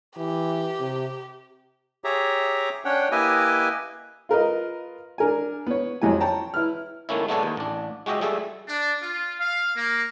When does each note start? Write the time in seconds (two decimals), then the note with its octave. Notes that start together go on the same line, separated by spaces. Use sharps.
0.17 E3 G4
0.80 C3
2.04 G4 G#4 C#5 E5 A#5
2.85 C#4 D4 C#5 F#5 G5
3.12 A#3 E4 G4 B4 D#5 G#5
4.29 F4 A#4 B4 D#5
5.18 D4 A#4 G#5
5.67 B3 C#5
6.02 F2 F#3 E4 G4 G#5
6.20 C#5 G5 A5 A#5
6.54 E4 B4 F6
7.09 D#3 A3 A#3 C#4 E4
7.29 G#3 A3 B3 D4 A4 C#5
7.43 D#2
7.57 A1 D4
8.06 G#3 F#4 G4 D#5 E5
8.21 G3 A3 G#4 A4 E5
8.67 D4
9.03 F4
9.39 F5
9.74 A#3